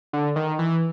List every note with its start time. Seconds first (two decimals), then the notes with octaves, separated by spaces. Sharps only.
0.13 D3
0.36 D#3
0.59 E3